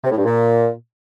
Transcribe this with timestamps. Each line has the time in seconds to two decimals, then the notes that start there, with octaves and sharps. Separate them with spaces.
0.04 C3
0.11 A2
0.18 G2
0.25 A#2